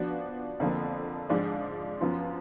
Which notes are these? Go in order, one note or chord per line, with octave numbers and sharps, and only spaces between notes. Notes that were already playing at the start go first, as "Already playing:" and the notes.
Already playing: F3 B3 D4 F#4
F2 D3 F3 A#3
G#2 F3 G#3 D4
F#2 F3 B3 F4